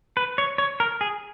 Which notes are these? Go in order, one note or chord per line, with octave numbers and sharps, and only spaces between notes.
B4
C#5
C#5
A#4
G#4